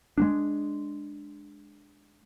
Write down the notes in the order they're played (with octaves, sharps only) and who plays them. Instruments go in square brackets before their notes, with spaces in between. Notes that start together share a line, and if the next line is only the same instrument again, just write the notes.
[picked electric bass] G#3 A#3 D4